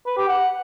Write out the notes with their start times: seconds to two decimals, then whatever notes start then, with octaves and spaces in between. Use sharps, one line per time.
0.07 B4
0.17 G4
0.28 F#5